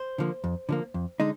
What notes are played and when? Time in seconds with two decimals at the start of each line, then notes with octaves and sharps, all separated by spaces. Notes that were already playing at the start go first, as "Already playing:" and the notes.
Already playing: C5
0.18 D3 F3 A#3
0.44 F2
0.69 D3 F3 A#3
0.94 F2
1.20 D3 G#3 D#4